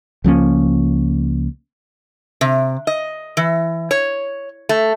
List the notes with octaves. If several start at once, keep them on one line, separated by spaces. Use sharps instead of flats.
C#2 F3 A#3 C#4
C3
D#5
E3
C#5
A3